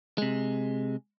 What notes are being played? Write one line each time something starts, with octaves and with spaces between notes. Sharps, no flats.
C3 G#3